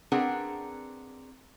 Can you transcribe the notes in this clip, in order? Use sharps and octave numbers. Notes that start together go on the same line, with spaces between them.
C4 D4 G#4 A#4 B4 F#5